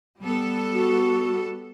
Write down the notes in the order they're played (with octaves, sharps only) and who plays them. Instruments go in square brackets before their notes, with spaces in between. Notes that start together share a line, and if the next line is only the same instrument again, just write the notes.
[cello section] G3 B3 A4
[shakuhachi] F#4